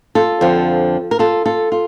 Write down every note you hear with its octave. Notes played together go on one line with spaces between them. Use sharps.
F4 A4
F2 D3 F3
A#4
F4 A4
F4 A4
F4